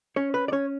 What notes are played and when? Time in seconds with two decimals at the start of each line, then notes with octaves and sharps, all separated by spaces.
0.16 C#4 C#5
0.34 B4
0.48 D5
0.52 C#4 C#5